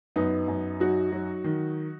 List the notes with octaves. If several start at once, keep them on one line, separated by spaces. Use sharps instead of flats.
F#2 B3 D#4
F#2
F#3 D#4 F#4
F#3
D#3